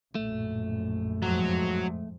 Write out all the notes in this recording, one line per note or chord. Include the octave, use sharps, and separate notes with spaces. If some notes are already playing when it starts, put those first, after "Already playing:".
A#1 F#2 A2 A3
F2 G#2 F#3